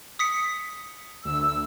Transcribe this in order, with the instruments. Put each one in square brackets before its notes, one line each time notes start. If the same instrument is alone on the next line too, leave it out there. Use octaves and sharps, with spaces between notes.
[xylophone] D#6 B6 C#7
[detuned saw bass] D2 [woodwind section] E6